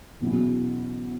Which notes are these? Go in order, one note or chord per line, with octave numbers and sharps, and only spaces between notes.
E2 B2 F#3 C#4 E4